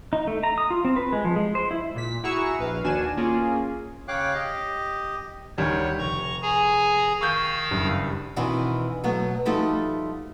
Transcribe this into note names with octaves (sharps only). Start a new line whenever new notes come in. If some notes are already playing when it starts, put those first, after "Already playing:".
D#4
A3
A#5
D#6
F4
C4
B4
G#3
F3
G#3
C5
E4
A#2 B6
E4 F#4 G#4 A#5 C#6 E6
A#1 B4 F5
D#2 D4 F#4 G#5 E7
A#3 C#4 F4 G#4
C#3 C#5 F5 G5 D6 F#6
G4 D#5
D2 D#3 G3 C#5
F1 A#5 C#6
G#4 G#5 A#5
D#3 F5 C#6 E6 G6
F#1 G2
B2 D#3 E3 C4 D4 F#4
B2 F#3 A3 B3
F3 G3 A3 D#4 F#4 A4